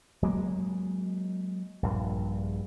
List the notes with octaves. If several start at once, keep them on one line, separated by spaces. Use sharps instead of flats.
F#3 G#3 A#3
A#1 G2